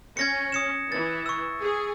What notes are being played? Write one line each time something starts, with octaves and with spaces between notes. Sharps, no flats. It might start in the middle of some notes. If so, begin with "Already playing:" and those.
C#4 G#6 A#6 C#7
D#6 C#7 E7
E3 A6
C#6 E6
G#4